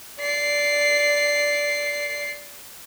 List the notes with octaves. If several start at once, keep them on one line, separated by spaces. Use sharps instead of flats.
D5 C7